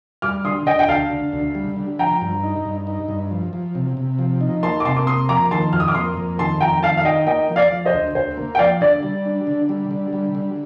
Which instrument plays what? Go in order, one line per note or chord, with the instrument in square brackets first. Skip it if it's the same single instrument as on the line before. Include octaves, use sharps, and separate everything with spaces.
[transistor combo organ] G3 [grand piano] D6 F6
[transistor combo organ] D3 [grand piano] C6 D#6
[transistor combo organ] D3 [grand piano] D#5 G5
[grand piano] G5
[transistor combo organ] D2 [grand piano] F5 A5
[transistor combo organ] D3
D2
G3
D3
[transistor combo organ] F3 [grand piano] G5 A#5
[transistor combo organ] G2
D#4
G2
D#4
G2
F3
F3
C3
C3
F3
D#4
[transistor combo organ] A#3 [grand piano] A5 C6
[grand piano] D6
[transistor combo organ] C3 [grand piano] A5 C6
[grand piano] D6
[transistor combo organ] A#3 [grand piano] C6 D#6
[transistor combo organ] F3 [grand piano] A#5 D6
[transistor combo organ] D#3 [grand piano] A5 C6
[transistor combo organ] F2 [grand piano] F6
[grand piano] D#6
D6 F6
[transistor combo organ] A#3 [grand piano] C6 D#6
[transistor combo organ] F2
[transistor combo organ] D#3 [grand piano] A5 C6
[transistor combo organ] F2 [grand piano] G5 A#5
[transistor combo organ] D#3 [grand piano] F5 A5
[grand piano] F5
[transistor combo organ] D#4 [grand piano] D#5 G5
[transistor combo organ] A#3 [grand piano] D#5 G5
[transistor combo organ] F3
[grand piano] D5 F5
[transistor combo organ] F3
[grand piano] C5 D#5
[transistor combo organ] D2
[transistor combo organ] D2 [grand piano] C5
[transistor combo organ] A#3
[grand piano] G5
[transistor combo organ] F3 [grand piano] D5 F5
[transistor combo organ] D3 [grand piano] D5
[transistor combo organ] G3
D4
D3
G3
D3
G3
D3